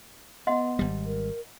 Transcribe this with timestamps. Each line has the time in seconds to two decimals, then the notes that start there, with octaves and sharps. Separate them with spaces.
0.47 B3 D#5 F#5 C6
0.79 G#1 G3
1.05 A#4